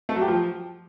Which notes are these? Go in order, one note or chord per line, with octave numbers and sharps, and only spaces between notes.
A3
F#3
G4
F3